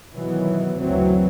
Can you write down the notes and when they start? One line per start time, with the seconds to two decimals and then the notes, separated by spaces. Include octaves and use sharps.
0.15 B2 D#3 E3 F#3 B3
0.80 F#1 D2 E3 F#3 C4